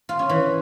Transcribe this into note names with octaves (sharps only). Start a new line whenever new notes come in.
F4
C#4
E3